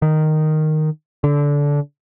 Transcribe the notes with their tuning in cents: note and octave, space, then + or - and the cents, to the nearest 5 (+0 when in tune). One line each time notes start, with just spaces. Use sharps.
D#3 -5
D3 -20